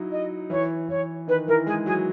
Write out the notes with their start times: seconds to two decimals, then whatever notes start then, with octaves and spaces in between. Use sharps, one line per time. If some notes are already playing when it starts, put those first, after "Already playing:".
Already playing: F#3 D#4 E4
0.11 D#5
0.50 E3 C#5
0.89 E3 C#5
1.28 D#3 B4
1.47 E3 A#4
1.66 G#3 G#4
1.86 F#3 G#4